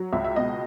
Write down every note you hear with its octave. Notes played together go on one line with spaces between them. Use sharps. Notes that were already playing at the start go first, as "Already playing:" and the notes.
Already playing: F#3
C#2 E5
E5
B2 D#5